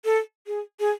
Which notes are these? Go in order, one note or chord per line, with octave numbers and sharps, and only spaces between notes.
A4
G#4
G#4